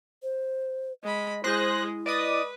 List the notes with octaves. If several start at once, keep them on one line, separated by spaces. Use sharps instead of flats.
C5
G#3 D#5 B5
G#3 E4 G#4 C5 F#6 A#6
B4 D5 D#5 D#6